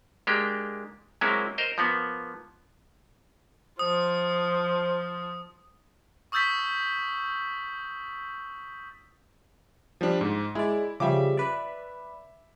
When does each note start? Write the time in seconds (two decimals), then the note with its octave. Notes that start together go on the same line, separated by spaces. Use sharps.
0.27 G#3 A#3 D4 G4
1.21 F#3 G#3 A#3 C4 C#4 E4
1.58 A#4 C5 D#5
1.78 F3 A#3 B3
3.79 F3 C5 D#6
6.32 C#6 D#6 E6 G6 A6 B6
10.01 F3 G3 D4
10.21 G#2
10.55 G#3 E4 D5
11.00 C#3 F3 G3 E5 D6
11.37 B4 D5